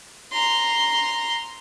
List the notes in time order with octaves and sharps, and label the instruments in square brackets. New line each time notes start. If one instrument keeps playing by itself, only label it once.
[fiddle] A#5 C6